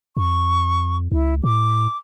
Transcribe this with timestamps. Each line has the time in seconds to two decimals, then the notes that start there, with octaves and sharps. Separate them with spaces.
0.17 F2 C#6
1.12 C#2 E4
1.44 A2 D6